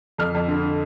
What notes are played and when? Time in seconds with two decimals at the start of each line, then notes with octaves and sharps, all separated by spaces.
0.18 F2 F6
0.34 F2
0.48 D3